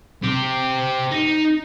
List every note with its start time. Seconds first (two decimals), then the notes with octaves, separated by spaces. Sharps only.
0.23 C4 G4
1.12 D#4